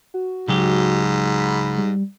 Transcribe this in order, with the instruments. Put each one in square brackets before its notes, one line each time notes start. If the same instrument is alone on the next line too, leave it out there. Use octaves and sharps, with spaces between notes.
[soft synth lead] F#4
[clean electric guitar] C#2 F#3 G4 [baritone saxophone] G#2
[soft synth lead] B5
G3